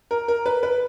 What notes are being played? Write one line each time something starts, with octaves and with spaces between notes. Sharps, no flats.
A#4
A#4
B4
B4